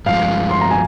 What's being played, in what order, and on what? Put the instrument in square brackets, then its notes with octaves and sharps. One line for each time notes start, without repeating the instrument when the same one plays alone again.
[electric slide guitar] G2 F3 G#3 [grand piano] F5
[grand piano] C6
A#5
G#5